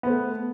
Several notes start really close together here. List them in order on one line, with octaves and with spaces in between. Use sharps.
B3 C5 A3